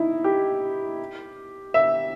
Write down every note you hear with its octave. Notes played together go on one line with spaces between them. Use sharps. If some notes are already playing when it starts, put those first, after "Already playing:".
Already playing: D#4 E4
G4
E5